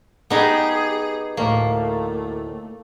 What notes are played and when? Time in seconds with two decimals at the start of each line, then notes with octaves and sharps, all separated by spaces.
0.30 B3 D#4 G4 G#4
1.37 D2 A2 A3 A#3